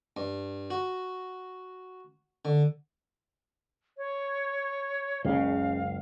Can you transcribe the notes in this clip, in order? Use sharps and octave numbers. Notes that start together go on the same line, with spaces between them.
G2
F#4
D3
C#5
F#1 C#2 C#3 F5